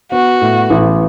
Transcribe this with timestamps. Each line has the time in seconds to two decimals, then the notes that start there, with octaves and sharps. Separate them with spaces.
0.12 B3 F#4
0.41 A2
0.70 A1